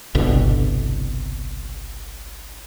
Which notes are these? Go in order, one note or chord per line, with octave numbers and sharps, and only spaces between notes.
G1 C2 B2 D3